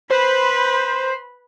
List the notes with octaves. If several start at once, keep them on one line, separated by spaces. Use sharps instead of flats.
B4 C5 B5